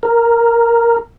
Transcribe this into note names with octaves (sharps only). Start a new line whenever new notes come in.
A#4